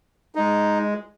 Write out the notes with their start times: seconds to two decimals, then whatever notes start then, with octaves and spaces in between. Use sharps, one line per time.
0.35 G#3 D#4